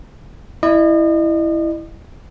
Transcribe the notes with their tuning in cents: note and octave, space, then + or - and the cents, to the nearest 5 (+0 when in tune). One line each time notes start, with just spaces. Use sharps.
E4 +0 D#5 -40